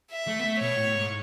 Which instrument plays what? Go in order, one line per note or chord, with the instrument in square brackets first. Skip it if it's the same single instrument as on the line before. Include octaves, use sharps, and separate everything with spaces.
[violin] E5
[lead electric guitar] A3
B3
A3
[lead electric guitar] B2 [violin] C#5
[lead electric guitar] A2
G#2